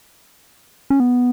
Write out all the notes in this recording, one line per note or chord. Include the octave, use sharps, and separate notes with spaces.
C#4
B3